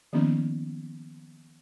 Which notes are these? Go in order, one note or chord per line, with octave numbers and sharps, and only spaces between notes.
D#3 F3 A#3 B3 C#4 D#4